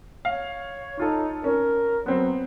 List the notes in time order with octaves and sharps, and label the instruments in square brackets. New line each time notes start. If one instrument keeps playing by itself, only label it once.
[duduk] C#5 [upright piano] F5
[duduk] D#4 [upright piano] F4 A4
[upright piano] C#4 [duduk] A#4
[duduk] F#3 [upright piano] B3 C4 C5